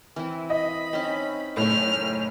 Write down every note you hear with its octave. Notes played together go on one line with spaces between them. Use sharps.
E3 C4 E4
D#5 B5
C4 C#4 D#4
F#1 A2 F6